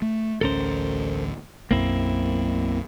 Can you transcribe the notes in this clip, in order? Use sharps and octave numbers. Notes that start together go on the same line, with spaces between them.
A3
A1 D2 C#4 A4 A#4 C5
B1 F#2 A#3 C4 E4